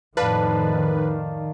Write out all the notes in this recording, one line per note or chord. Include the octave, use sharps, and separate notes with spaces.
F2 A2 D#3 B4 D5 F5 A5